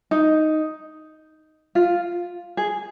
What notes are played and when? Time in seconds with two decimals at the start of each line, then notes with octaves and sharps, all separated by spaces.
0.11 D#4
1.75 F4
2.57 G#4